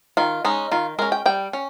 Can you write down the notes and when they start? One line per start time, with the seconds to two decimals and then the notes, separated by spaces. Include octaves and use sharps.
0.17 D#3 F4
0.45 G#3 C#4 D#4
0.71 D#3 F4
0.99 G#3 C#4 A#4
1.12 G5
1.26 G3 G5
1.53 C#4